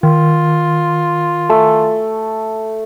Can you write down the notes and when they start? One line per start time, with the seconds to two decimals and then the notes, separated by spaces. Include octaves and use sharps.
0.03 D#3 F4
1.50 A3